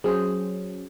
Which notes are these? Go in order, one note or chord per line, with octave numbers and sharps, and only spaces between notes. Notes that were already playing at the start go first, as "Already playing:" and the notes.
F#3 C#4 G#4 C5